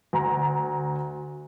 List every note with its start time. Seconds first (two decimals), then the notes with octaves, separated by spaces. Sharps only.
0.13 D2 A#5